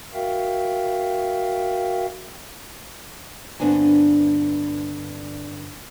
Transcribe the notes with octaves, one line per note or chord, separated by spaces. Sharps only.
F#4 A#4 E5 F5 G5
G2 D3 B3 C4 D4 G#5